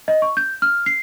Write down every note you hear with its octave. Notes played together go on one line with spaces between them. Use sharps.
D#5
C#6
G6
F6
C7